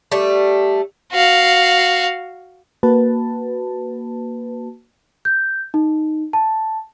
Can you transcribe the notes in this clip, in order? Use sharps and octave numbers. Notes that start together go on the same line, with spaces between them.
G3 A3
F#4 F5
A#3 F#4 B4 A5
G6
D#4
A5